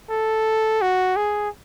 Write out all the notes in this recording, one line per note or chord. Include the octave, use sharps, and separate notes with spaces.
A4
F#4
G#4